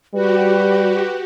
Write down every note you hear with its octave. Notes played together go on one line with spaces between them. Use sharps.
G3 F#4 G4 B4